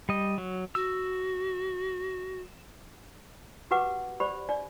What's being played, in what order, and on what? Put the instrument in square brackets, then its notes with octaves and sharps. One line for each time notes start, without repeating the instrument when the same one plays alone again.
[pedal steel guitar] G3 D#5
F#3
[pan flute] F#4 [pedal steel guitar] E6
[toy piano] F#4 G4 B4 F#5 D6
G4 C5 D5 B5
D4 D5